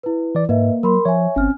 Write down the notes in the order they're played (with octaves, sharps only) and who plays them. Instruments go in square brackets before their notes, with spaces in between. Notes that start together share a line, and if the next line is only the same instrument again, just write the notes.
[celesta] E4 B4
[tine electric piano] E3 D5
[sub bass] G#2 [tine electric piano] A#3 [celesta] B4 D#5 E5
[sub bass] F#3 [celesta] A#4 B5 C6
[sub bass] F3 [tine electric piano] C#5 [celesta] E5 G#5
[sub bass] G1 [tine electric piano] C4 C#4 [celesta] G#5 F6